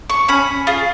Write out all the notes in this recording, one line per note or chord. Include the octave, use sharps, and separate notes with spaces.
C#6
C#4 B5
F4 G#4